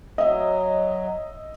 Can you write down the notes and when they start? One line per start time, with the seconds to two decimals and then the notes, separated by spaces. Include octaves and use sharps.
0.18 F#3 D#5 E5